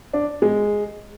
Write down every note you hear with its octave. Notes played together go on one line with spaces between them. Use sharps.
D4
G#3